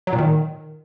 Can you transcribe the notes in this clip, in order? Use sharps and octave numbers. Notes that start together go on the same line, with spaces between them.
F#3
A#2
D#3